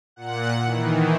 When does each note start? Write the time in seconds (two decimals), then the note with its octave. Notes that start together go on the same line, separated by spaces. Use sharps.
0.16 A#2 F#5
0.62 D#3 E3